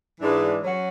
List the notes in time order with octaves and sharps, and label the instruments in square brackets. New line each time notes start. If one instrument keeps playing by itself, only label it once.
[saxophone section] G#2 E3 G#3 D4
F#3 C#4 F#4